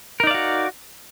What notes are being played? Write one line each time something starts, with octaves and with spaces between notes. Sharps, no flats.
D#4 F#4 A#4 D5 F5